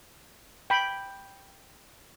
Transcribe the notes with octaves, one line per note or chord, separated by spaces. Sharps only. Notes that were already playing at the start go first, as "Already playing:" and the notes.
G5 B5